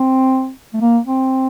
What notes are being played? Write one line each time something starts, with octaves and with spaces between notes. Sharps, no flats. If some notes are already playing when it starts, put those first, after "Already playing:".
Already playing: C4
A3
A#3
C4